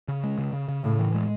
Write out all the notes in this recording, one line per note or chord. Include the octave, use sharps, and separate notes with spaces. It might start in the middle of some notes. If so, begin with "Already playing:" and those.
C#3
G#3
C#3
C#3
C#3
A2 C#3
E3
G#3